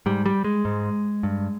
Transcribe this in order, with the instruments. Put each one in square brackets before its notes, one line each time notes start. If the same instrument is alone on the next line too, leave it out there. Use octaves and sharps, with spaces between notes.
[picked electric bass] G#2 G3
G3
G#3
G#2
G2